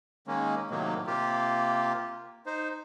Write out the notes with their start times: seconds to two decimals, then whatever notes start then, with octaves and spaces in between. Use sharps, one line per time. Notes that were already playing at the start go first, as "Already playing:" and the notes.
0.27 D#3 G#3 A#3 C#4
0.71 A2 C3 D#3 F#3 A#3
1.07 C3 A#3 F4 G4
2.46 D#4 C5